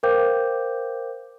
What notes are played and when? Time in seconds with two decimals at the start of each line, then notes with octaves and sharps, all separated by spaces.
0.03 A#4 C5 F5 G5 D6 G6